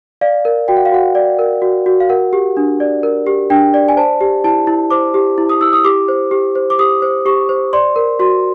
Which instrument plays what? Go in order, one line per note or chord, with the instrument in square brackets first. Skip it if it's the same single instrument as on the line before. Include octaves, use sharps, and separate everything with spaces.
[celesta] D5 F5
A#4
F#4 G5
F#5
F5
F#4 F#5
D5
A#4
F#4
F#4
F5
A#4 F#5
G4
D4
D5
A#4
G4
D4 G5
D5
G#5
C5 A5
G4
E4 A5
E4
C5 D6
G4
E4
D#6
E4 E6
D#6
G4 D6
C5
G4
C5
D6
G4 D#6
C5
G4 C#6
C5
D5 C6
A#4
F#4 C6